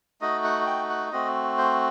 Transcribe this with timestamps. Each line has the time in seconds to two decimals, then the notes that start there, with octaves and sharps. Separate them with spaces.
0.21 A3 D#4 F#4 D#5
0.44 F#5
0.66 G5
0.90 F#5
1.12 A3 C4 F#4 D#5
1.58 C5